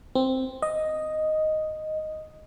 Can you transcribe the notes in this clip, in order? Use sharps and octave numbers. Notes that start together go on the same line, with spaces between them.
C4
D#5